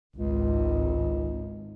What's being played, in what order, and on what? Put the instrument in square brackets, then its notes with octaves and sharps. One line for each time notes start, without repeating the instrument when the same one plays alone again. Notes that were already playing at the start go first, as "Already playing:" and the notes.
[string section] G#1 [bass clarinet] C#2